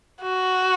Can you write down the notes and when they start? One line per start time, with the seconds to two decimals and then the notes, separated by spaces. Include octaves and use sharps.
0.22 F#4